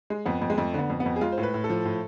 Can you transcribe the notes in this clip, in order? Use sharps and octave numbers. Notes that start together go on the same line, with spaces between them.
G#3
F2 B3
F2
G#3
F2 A3
D3 B3
F2
B3
F2
G#4
G#3 F4
C5
A2
B4
A2
A4
F3
A2